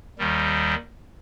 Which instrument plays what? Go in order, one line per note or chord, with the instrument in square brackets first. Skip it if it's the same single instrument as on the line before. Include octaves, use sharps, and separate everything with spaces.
[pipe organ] D#2 D#3 G3